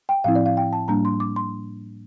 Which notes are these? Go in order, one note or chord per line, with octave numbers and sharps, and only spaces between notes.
G5
A2 F3 C4 E4 F5
D5
F5
G5
A5
A2 G3 A#3 D4 A#5
C6
D6
C6